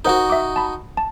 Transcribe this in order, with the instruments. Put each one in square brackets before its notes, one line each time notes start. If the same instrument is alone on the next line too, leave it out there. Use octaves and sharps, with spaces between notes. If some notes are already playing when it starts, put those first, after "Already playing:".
[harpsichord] D#4 F#4 [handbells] A#4 C5 F#5
[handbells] E5 D6
A5 B5
A5